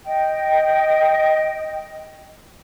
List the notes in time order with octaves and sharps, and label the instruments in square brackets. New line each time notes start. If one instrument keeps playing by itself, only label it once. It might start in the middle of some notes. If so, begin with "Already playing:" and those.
[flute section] D#5 G5